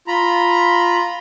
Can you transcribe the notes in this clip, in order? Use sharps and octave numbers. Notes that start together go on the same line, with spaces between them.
F4 A#5 B5